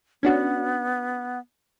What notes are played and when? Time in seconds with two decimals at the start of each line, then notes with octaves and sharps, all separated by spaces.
0.23 B3 C#4 D4 F#4